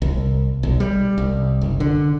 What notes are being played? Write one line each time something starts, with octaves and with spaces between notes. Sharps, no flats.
C2
B1
G3
C2
F#1
D3